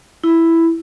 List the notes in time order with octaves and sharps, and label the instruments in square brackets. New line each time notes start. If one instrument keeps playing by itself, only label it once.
[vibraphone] E4